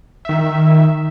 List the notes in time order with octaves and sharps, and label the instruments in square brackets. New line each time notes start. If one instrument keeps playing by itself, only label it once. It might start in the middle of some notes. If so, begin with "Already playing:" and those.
[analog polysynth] D#3 E5